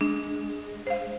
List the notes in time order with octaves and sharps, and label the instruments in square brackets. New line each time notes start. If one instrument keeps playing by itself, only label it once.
[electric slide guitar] G#3 [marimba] D4
[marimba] C5 F5